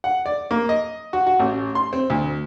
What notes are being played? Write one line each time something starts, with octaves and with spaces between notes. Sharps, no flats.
F#5
D5
A#3
D#5
F#4
F#4
A1
C6
C4
D2